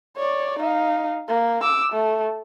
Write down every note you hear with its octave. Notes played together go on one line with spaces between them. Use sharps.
C#5 D5
D#4 F5
A#3
D6 E6
A3